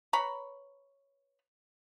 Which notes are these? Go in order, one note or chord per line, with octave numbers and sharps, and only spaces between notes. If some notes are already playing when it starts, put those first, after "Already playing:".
B4 C#5 A#5 B5